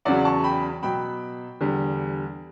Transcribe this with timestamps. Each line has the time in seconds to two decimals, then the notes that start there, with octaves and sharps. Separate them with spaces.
0.05 E2 C#3 F#3 D5 F#5
0.25 A5 C#6
0.44 G5 B5
0.83 B2 F#3 G5 B5
1.60 E2 D3 G3